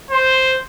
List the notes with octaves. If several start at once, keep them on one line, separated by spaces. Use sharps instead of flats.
C5